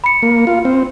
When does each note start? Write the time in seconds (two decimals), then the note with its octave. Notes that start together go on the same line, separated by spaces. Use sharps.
0.04 B5 C#7
0.22 A#3
0.47 F4
0.65 C4